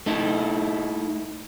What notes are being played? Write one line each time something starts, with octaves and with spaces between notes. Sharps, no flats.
A3 D#4 E4